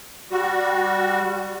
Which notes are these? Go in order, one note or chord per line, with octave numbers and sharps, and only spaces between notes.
G3 F#4